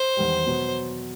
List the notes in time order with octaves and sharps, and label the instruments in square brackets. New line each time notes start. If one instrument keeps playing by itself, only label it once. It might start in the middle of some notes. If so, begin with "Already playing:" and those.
Already playing: [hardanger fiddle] C5
[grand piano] E2 D#3 G3
B2 F#3 B3